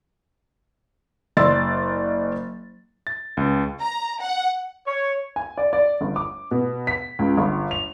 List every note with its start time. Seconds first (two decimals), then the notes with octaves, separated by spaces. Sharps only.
1.37 F#1 D5 D#5 C6 E6 A6
3.07 A6
3.37 C#2
3.80 A#5
4.21 F#5
4.87 C#5
5.36 G#5
5.58 D5
5.73 D5
6.01 G1
6.16 D6
6.51 B2
6.87 B6
7.19 C#2
7.37 G1
7.71 F7